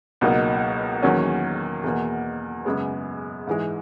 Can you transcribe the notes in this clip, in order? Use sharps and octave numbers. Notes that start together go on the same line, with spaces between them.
C#2 B2 F#3 A#3 D#4
E2 D#3 F#3 A#3 C#4
E2 B2 A#3
F#2 C#3 G#3 B3
G#2 E3 G#3